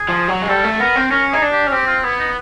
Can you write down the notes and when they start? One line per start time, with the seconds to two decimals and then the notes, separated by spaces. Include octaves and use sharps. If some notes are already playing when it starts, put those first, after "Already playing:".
Already playing: G#4
0.09 F3
0.28 F#3
0.42 G#3
0.49 G3 A4
0.64 A3
0.80 B3 A#4
0.95 C4
1.11 C#4 A#4
1.31 D#4 G#4
1.42 D4
1.52 G4
1.67 C#4
1.72 C4 G4
1.87 F4
2.03 B3 E4
2.19 D#4